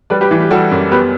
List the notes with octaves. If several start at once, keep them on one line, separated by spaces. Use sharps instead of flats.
G3 B4 D5
G4 B4
E3
G4
G3 F#4 A4
F#2
B3 G4 B4